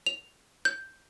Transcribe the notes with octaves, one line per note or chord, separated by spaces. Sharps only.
F7
G6